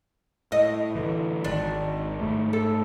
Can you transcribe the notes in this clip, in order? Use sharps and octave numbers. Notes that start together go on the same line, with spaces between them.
A2 D#5
A2 D3 E3
G#1 D#3 D4
G#2 A3
A4